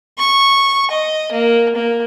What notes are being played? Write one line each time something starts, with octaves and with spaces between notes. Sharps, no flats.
C#6
D#5
A#3
A#3